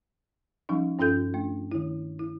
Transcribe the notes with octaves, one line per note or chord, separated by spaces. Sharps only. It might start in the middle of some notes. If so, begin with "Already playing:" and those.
F3 G3 C#4 D#4
G2 C#4 F4 A4 G6
A3 D4
D#3 E4
E4